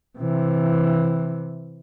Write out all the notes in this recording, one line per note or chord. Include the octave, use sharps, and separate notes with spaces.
C3 E3